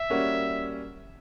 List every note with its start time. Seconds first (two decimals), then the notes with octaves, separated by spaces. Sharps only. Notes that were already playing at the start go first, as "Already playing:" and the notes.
Already playing: E5
0.10 G3 A#3 C#4 F#4